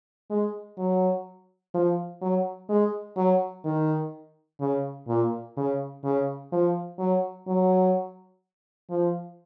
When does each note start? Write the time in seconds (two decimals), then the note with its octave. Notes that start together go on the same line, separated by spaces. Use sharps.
0.30 G#3
0.78 F#3
1.74 F3
2.22 F#3
2.69 G#3
3.17 F#3
3.65 D#3
4.60 C#3
5.08 A#2
5.57 C#3
6.04 C#3
6.52 F3
6.99 F#3
7.48 F#3
8.91 F3